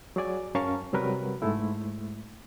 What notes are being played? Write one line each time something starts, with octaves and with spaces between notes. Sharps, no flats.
F#3 G#4 D5 G#5
F#2 C#4 A#4 F5 A5 C#6
C3 F#3 G3 A#4 B4
G#2 G#3 A3 E4